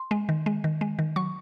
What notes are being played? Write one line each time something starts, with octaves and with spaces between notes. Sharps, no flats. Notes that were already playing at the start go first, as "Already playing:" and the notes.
Already playing: C6
G#3
D#3
G#3
D#3
G#3
D#3
F#3 C#6